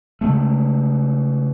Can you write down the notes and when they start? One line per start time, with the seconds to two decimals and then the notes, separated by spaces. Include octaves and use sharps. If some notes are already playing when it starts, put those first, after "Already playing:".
0.21 C#3 G#3 A3